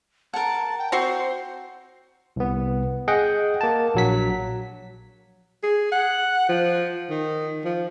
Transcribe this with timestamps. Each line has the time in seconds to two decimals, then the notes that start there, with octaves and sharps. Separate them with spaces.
0.34 A#4 F#5 A5
0.78 G5
0.92 C4 F#4 C5 C6
2.36 C2 B3
3.08 G#4 D#5 F#5 G5
3.61 A#3 A5
3.95 A#1 F#3 B6
5.63 G#4
5.92 F#5
6.49 F3
7.10 D#3
7.65 F3